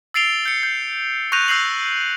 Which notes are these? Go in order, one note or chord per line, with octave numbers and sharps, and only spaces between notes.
E6 A6 C7 D7 F7 G7
G6 C#7
G6
C#6 F#6 G6 A#6 D#7 F7
E6 G6 A#6 C7 F#7